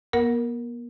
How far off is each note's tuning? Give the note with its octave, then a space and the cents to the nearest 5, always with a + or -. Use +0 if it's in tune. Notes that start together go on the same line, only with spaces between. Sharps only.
B3 -45 A#4 +0 F#5 -15